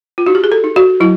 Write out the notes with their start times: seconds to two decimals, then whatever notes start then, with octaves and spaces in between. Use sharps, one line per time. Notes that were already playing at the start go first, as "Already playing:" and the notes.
0.18 F4
0.26 D#4 F#4
0.35 G4
0.44 G#4
0.52 A4
0.64 D#4
0.76 F#4
1.00 F#3 E4